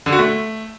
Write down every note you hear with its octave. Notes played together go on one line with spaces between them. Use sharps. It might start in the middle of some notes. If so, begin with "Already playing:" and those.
D3
F#4
A3